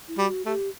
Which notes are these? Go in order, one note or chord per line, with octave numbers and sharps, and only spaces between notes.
E4
G3 F#4
A3 G4